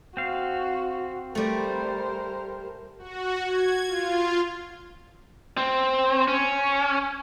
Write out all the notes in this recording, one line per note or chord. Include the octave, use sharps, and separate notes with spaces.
C4 F#4 F5
G3 A3 A#4 C5
F#4
G#6
F4
C4
C#4